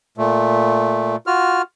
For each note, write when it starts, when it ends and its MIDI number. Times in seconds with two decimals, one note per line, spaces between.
0.18 1.16 46
0.18 1.16 57
1.27 1.62 65
1.27 1.62 66
1.27 1.62 89